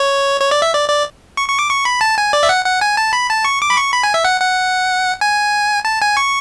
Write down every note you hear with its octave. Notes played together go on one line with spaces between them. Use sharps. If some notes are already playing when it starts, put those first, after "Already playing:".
Already playing: C#5
C#5
D5
E5
D5
D5
C#6
C#6
D6
C#6
B5
A5
G#5
D5
E5
F#5
F#5
G#5
A5
B5
A5
C#6
D6
B5
C#6
B5
G#5
E5
F#5
F#5
G#5
A5
G#5
C#6